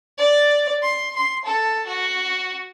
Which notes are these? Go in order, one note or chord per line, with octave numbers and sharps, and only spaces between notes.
D5
C6
C6
A4
F#4